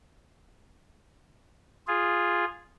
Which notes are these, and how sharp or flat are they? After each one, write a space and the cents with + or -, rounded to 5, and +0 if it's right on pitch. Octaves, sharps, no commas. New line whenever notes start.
F4 +0 G#4 -10